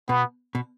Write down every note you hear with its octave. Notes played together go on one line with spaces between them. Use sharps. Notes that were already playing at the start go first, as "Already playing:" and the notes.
B2 B3
B2